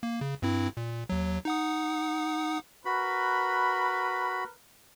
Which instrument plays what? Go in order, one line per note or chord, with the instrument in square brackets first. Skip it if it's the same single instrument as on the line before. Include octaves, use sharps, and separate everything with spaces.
[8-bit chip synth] A#3
C#3
G2 C4 E4
A#2
D#2 F#3
D#4 F#5 D#6
[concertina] F#4 B5 [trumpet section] A#4 B4